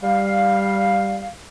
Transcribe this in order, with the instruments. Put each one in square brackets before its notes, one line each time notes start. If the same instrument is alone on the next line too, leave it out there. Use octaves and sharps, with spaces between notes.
[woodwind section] G3 F5